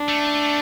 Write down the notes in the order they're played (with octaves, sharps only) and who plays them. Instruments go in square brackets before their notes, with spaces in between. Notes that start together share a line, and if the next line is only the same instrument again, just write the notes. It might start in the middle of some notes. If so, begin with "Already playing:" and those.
Already playing: [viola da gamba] D4
[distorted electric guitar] A3